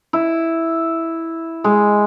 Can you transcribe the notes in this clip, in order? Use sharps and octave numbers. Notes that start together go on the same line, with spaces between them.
E4
G#3